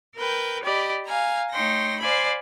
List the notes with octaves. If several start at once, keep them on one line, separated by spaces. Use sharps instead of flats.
A#4 B4 G5 G6
G4 D5 D#5 B5
F5 G#5 A#5
A3 D#4 C#5 G5 C6 A#6
C5 D5 F5 G#5 B5